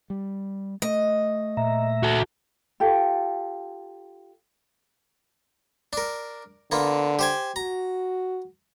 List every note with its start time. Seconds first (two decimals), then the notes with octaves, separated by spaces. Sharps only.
0.10 G3
0.82 A3 D#5
1.57 A#2 E5 A#5
2.03 F#4 A4
2.80 F4 G4 A4
5.93 D4 A#4
6.72 D3 A#3 B3 F4
7.19 G4 C5 G#5
7.56 F#4 A#5